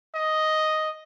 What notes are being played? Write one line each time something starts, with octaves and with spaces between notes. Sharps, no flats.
D#5